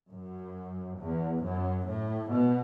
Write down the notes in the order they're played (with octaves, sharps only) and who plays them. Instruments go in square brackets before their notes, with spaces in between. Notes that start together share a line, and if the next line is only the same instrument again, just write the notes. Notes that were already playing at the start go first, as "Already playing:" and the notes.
[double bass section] F#2
E2
F#2
A2
B2